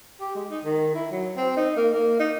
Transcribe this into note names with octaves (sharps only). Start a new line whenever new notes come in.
G4
G#3
D#4
D#3
E4
F#3
C4
D#4
A#3
A#3
D#4